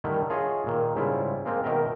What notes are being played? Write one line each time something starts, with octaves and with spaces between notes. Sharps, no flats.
D3 D#3 G3 A3 E4
F4 G#4 C#5 D#5 E5
A#2 D#3
G#2 C#3 G3 E4 F4
G#3 A#3 C4 F4
B2 D#3 A#4 E5 G5 A#5